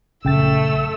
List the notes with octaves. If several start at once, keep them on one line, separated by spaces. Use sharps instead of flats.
A#1 F#2 C#3 A3 G5 E6 A6